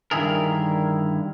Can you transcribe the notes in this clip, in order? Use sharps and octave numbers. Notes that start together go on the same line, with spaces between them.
G2 D3 D#3 E4 G#4 A#4